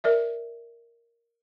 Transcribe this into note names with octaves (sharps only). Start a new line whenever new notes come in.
A#4 D5 E5